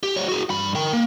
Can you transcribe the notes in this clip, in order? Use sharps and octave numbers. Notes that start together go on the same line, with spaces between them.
G4
G3 C#5
F#4 G#4
G2 B5
A#4 G5
A#3